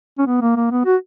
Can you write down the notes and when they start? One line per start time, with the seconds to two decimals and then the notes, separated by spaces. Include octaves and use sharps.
0.18 C#4
0.26 B3
0.41 A#3
0.56 A#3
0.71 B3
0.85 F#4